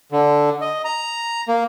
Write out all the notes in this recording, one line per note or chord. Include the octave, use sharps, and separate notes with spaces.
D3
D#5
A#5
A#3